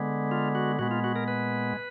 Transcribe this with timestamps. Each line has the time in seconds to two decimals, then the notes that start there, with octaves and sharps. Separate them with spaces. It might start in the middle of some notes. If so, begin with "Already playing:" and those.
Already playing: D3 G#3 B3
0.31 F4
0.55 F#4
0.79 A#2 G#3 B3 F#4
0.91 F4
1.04 F#4
1.16 A#4
1.28 B4